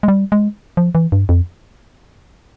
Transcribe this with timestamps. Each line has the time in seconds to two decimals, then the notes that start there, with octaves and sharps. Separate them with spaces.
0.03 G#3
0.08 G3
0.32 G#3
0.77 F3
0.95 E3
1.12 G2
1.29 F2